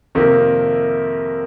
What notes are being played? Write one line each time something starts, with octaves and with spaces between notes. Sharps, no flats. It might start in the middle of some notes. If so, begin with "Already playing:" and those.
F2 C3 D#3 A#3